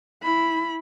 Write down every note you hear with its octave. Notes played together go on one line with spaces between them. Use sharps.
E4 B5